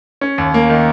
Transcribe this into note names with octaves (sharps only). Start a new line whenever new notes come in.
C#4
D#2
A#3
D#3